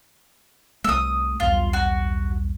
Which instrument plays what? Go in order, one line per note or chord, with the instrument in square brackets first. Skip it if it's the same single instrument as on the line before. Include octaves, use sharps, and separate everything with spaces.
[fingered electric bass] C2 A3 [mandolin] D#6 E6
[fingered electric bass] B1 E2 G2 [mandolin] F4
[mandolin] F#4